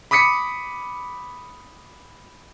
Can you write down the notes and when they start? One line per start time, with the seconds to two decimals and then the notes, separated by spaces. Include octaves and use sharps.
0.11 B5 D6 D#6 B6 C#7